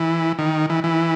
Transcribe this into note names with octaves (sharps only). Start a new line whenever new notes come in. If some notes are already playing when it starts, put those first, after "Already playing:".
Already playing: E3
D#3
E3
E3